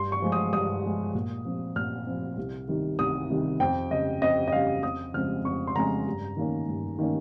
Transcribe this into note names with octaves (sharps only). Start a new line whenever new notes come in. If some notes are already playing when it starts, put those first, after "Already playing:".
Already playing: G2 C6
C#6
F3 G#3
D#6
G2 D#6
F3 G#3
A#2
F3 C4
A#2 F6
F3 C4
C2
C3 D#3 G3
C2 D#6
C3 D#3 G3
F2 G5
C#3 G3 D#5
F2 D#5
D#5
C#3 G3 F5
F2 D#6
C#3 F3 G#3 C4 F6
F2 C#6
C6
C#3 F3 G#3 C4 A#5
G2
D#3 A#3 C#4
G2
D#3 A#3 C#4